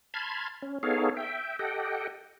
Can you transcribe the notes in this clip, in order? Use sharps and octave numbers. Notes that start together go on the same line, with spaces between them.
A5 B5 C6 F6 G#6
C#4
B3 D#4 G#4 A4 C#5 F5
E5 G5
G4 A4 D#5 F#5 G5